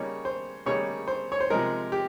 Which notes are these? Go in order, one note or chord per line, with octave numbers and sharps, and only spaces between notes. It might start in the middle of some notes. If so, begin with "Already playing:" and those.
Already playing: C#3 G3 A#3 D#4 C#5
C5
C#3 G3 A#3 D#4 C#5
C5
C#5
C5
C3 F3 G#3 D#4 A#4
G4